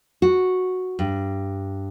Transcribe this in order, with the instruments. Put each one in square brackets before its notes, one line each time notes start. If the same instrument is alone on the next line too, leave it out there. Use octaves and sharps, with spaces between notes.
[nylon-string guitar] F#4
G2